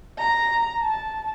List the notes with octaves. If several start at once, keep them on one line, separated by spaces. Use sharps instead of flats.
A#5
A5